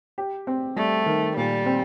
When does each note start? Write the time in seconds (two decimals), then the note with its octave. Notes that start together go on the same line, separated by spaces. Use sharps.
0.18 G4
0.47 C4
0.76 G3 A3
1.06 D#3
1.36 A#2 G3
1.66 C4